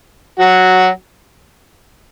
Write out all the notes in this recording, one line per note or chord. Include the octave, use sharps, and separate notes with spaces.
F#3 F#4